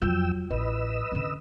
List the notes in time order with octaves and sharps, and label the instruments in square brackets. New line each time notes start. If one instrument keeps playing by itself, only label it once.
[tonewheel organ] F2 G5 E6 [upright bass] F#3 F4
[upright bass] A1 [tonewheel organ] B4 D#5 E6
[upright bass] D3 C#4